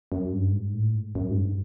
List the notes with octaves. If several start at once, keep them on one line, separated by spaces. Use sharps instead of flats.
F#2
G2
G#2
A2
G#2
F#2
G#2
G2